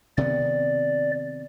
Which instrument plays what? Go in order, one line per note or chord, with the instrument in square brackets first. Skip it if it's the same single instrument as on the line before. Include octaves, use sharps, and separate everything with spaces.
[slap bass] C3 D#3 B3 [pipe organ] D5